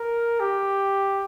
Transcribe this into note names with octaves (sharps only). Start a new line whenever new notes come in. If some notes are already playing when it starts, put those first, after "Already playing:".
Already playing: A#4
G4